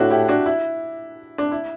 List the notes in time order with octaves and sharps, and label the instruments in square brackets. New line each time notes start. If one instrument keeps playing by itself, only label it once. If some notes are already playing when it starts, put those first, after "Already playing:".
Already playing: [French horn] A2 [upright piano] D4 E4 F#4
[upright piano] E4 G4
D4 F#4
E4
D4
E4